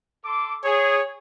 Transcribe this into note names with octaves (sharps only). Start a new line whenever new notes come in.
A4 C6 D6
G#4 C#5